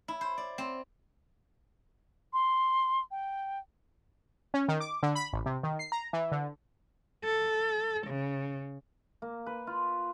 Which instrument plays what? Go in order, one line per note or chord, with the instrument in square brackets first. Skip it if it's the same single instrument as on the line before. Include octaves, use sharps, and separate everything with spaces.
[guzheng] E4
C5
D5
C4
[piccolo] C6
G5
[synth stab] C#4
D#3
D6
D3
B5
A1
C3
D#3
C7
A#5
E3
D3
[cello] A4
C#3
[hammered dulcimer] A#3
B4
F4